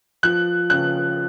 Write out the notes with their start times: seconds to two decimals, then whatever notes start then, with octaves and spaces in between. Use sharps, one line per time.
0.23 F3 F#6
0.70 C#3 F#6